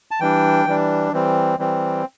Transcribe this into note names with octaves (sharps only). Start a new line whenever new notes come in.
A5
E3 G3 D4 G5
E3 G3 D4
E3 G3 C4
E3 G3 C4